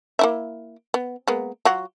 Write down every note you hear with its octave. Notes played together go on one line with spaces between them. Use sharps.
A#3 E4 E5
B3
G#3 A#3 B3
F#3 F4 F#4